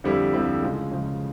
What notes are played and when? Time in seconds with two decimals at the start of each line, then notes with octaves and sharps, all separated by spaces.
0.04 F2 D3 G3 C4 E4
0.33 F2 D3 G3 C4 E4
0.62 C#3 F3 G#3
0.91 C#3 F3 G#3